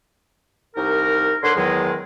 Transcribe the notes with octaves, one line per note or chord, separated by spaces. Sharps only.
C2 D#4 A#4
D3 A#4 B4 C#5 C6
E2 D#3 F#3 G#3